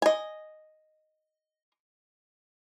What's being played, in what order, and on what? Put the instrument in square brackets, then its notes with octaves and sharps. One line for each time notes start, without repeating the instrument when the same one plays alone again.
[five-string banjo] D#5 G#5